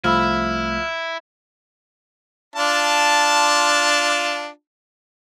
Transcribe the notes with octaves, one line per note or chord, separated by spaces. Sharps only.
C2 F3 A3 E4 B5 E6 F6
D4 F4 A5